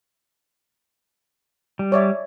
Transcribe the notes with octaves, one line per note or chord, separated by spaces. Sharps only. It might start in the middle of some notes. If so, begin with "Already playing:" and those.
G3
C#5 D5 E5